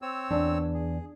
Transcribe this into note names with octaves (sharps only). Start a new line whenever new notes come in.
C4 C#5 E6
E2 D4
G#4